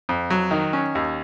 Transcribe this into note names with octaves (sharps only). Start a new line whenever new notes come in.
F2
F#3
D#3
C#4
D#2